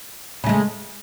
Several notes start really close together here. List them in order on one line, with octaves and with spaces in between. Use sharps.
C#3 A3 G#3